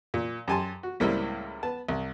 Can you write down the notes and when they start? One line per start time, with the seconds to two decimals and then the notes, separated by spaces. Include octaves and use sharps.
0.14 A#2
0.48 F#2 G4 G#5 A5 C6
0.83 F#4
1.00 C#2 A2 G3 A#3 C4 E4
1.63 B3 A5
1.89 C2